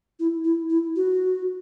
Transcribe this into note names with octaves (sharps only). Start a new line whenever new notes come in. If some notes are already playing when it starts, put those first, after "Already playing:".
E4
E4
E4
F#4